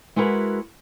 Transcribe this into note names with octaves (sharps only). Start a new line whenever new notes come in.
G#3 E4 F#4 G4 A#4 B4